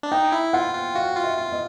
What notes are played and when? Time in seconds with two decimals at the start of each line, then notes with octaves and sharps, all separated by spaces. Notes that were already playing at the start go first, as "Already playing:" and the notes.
0.03 D4
0.12 D#4 G5
0.32 E4
0.53 F4 F#5
0.75 F4
0.95 F#4 F5
1.17 F4
1.24 E5
1.37 F4
1.52 D#5